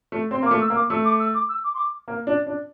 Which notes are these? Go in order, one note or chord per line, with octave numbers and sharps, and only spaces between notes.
A3
C4 C6
A#3 D6
A3
E6
A#3
D6
A3 E6
D6
E6
D6
E6
D6
C6
D6
A#3
D4
D4